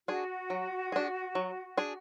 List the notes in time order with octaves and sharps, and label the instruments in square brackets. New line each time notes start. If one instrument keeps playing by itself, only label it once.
[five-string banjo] D4 G#4 [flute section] F#4
[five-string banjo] F#3
D4 G#4
F#3
D4 G#4